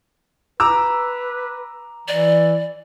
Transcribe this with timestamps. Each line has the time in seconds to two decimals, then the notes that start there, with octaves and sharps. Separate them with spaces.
0.60 B4 A#5 D6 E6
2.08 E3 D5